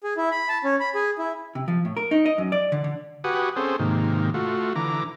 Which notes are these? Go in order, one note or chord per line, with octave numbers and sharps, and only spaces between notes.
G#4
E4
B5
A5
C#4
B5
G#4
E4
C3
F3
A2
A#4
D#4
D#5
F#2
D5
D3
D3
F#4 G4 B4 F#5 G#5 D#6
C4 C#4 G#4 A4 C5
G#2 C3 D#3 A#3
A3 F4 F#4
D3 E3 A#5 D6